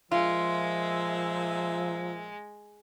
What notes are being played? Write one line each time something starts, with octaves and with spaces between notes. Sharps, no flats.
A#2 F3 G#3 F4 E5